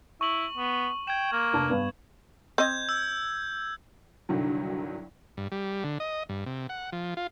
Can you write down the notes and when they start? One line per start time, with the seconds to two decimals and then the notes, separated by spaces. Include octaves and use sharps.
0.21 E4 C#6 F#7
0.57 B3
1.07 G5 G#6 E7
1.32 A#3
1.53 F1 D4 A5
1.70 G2 B3
2.58 C4 D#5 G6 G#6
2.89 E6
4.29 C2 G2 D3 D#3 F#3
5.37 G2
5.52 G3
5.84 D3
6.00 D#5
6.29 G2
6.46 C3
6.69 F#5
6.92 F3
7.17 F4